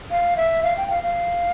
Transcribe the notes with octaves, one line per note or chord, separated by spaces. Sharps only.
F5
E5
F5
G5
F5
F5